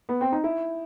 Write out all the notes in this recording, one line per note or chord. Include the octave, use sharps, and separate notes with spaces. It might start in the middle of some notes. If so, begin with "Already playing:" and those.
B3
C4
D#4
E4